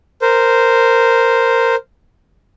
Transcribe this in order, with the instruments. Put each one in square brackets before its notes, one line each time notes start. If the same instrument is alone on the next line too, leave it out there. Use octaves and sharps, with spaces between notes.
[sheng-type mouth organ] A#4 C5